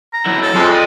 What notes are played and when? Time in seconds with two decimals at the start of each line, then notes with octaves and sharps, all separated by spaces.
0.13 A#5
0.26 F#3 E4
0.42 A4
0.56 F2 G#3
0.71 D5 D#5